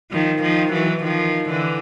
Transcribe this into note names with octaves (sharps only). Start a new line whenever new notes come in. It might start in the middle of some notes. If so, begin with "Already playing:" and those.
D#3 F3
D#3 F3
E3 F#3
D#3 F3
D3 E3